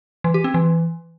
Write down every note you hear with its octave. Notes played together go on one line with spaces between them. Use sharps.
E3
G4
C4
E3